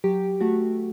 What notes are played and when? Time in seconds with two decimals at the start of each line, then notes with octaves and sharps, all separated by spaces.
0.04 F#3 G4
0.41 A3 F#4